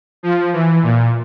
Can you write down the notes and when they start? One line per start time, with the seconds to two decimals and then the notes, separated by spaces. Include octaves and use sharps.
0.23 F3
0.53 E3
0.83 A#2